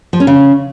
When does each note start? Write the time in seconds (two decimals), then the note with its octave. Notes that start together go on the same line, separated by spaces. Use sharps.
0.13 F3
0.20 C#4
0.27 C#3